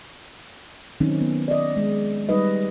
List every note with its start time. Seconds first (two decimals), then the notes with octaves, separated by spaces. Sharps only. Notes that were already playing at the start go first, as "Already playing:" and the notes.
1.00 D#3 F#3 C4 C#4 D#4
1.21 B3
1.48 D5 D#5
1.77 G#3
2.29 G3 D#4 B4 D#5